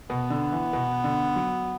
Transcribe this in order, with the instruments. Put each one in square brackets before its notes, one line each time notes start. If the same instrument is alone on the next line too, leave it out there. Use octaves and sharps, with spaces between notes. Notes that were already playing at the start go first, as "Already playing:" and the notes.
[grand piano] B2 [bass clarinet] B3
[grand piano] D3
E3
B2
D3
F#3